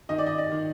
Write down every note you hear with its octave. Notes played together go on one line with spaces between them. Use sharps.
D#3 D#5
D5
D#5
D5
D#3